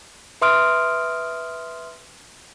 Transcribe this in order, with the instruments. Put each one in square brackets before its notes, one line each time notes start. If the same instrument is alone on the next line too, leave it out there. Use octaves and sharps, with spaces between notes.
[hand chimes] B4 E5 C6 D#6 F6 D7